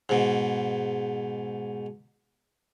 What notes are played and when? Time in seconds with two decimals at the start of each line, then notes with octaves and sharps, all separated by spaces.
0.09 G#2 B2